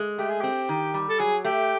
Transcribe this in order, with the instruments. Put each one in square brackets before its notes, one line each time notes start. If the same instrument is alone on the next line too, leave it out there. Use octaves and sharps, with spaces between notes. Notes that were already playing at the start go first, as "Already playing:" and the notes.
Already playing: [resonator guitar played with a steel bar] G#3
[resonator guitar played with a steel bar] A3 [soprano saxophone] G4
[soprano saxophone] G#4
[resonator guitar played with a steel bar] C4 [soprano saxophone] G4
[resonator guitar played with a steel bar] D#3
G3
[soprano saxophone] A4
[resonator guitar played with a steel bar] F#3 [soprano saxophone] G#4
[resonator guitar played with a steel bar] A3 [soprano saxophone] G4